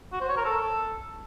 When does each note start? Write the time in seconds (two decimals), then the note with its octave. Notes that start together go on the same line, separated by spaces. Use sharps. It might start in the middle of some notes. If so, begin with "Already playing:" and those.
0.12 F#4
0.21 C5
0.29 C#5
0.37 A#4
0.45 A4